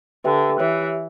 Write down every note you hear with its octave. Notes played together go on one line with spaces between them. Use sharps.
D3 G4 B4 E5 G5
E3 G4 C#5 E5